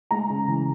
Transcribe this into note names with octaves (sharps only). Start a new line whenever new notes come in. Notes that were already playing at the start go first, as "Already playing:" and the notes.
G#3 A#5
C#3
E3